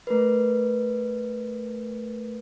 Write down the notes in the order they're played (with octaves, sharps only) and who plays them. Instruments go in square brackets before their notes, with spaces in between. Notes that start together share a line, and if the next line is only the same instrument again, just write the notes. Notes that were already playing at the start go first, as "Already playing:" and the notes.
[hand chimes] A3 A#4 B4